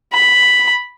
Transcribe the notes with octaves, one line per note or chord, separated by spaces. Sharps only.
B5